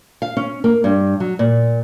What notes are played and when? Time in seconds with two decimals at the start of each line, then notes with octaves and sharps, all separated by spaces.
0.22 F5
0.37 C#4
0.64 A#3
0.84 G2
1.20 F#3
1.39 A#2